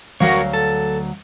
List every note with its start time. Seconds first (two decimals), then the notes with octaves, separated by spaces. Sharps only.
0.20 D2 F#3 F#4 A#4 C#5 F5
0.53 A4